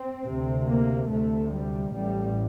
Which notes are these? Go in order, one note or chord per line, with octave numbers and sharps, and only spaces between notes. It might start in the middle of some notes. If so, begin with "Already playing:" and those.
Already playing: C4
D2 C3
A#3
D2 C3 A3
G3
A1 A2 G3